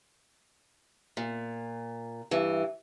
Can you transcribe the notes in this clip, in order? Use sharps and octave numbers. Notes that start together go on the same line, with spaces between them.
A#2
G2 E3